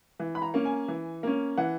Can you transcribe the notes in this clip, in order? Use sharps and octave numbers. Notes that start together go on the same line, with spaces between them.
E3
B5
A#5
A#3 C#4
G#5
E3
A#3 C#4
E3 F#5